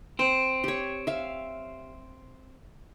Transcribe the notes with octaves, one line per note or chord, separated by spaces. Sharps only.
C4 C5
G4 C#5
E5 F5